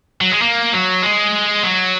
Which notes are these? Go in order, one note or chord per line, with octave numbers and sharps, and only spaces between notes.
F#3
G#3
A#3
F#3
G#3
F#3